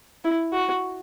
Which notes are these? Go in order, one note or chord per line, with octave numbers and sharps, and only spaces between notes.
E4
F#4